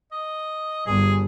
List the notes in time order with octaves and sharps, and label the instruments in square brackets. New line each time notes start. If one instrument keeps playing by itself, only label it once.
[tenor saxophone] D#5
[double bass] G1 G2 [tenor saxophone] G#4